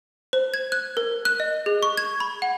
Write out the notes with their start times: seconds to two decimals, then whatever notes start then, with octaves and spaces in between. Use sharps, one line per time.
0.33 C5
0.54 G#6
0.72 F#6
0.97 A#4
1.25 F#6
1.40 D#5
1.66 G#4
1.83 C#6
1.97 G#6
2.20 B5
2.42 F#5